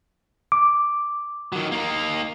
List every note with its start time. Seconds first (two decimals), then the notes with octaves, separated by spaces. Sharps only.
0.52 D6
1.52 D#3 F#3
1.72 A#3 D#4